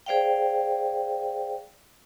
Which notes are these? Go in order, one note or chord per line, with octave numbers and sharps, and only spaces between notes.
G#4 C5 D5 F5 G5